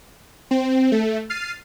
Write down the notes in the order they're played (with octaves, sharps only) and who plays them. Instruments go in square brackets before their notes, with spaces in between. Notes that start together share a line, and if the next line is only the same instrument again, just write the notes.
[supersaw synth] C4
A3
F6 A6 C7 D#7